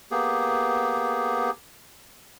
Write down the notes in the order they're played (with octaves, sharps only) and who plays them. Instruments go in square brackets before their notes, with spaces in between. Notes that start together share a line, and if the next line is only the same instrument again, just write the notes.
[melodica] A#3 B3 G4 G#4